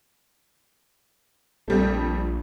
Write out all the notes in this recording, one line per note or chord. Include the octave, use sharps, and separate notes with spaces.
A#1 F2 G3 A3